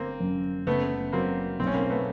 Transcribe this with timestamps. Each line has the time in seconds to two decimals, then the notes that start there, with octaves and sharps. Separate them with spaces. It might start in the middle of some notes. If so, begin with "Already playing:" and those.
Already playing: G1 A#3 C4
0.20 F#2
0.66 F#1 A3 B3
1.13 F#3 A#3 C4
1.59 B1 C4
1.67 C#4
1.75 A#3 C4
1.90 A3 B3